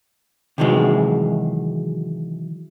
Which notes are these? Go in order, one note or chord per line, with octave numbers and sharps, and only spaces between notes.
C3 D#3 E3 F#3 G#3